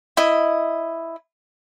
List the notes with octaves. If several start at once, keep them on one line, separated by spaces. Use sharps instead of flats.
E4 D#5